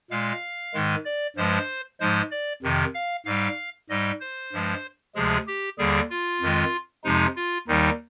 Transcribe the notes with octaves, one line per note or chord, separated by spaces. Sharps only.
A#2 G#3 F5
G#2 D#3 G#3
D5
G2 F3 G#3 C5
G#2 F3 G#3 C5
D5
F2 C3 D#3
F5
G#2 G3 F5
G#2 G3 D#5
C5
G2 F3 G#3
D2 C3 F3 G#3 G#4
G4
D#2 D3 G3 G#4
F4
F2 D#3 G#3
F2 C3 F3 G#3 D#4
F4
D#2 D#3 G3 D#4